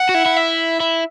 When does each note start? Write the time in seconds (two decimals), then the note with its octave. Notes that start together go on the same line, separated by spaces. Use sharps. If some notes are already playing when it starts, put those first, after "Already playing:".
Already playing: F#5
0.09 F#4
0.14 E4
0.26 E4
0.36 E5
0.80 E4